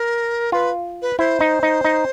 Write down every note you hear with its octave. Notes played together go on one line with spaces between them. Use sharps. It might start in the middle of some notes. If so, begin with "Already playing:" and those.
Already playing: A#4
F4 B4
B4
E4 C5
D#4
D#4
D#4